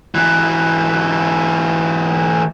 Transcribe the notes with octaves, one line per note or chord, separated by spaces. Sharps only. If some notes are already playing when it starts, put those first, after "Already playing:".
G#2 E3